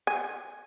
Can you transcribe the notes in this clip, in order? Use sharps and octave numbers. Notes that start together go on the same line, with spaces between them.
G#5